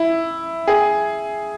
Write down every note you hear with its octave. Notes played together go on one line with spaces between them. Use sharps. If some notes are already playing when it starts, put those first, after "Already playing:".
Already playing: E4
G#4